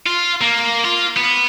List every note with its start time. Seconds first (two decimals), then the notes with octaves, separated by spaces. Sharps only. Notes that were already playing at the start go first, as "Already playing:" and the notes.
0.07 F4
0.41 A#3
0.85 F4
1.17 B3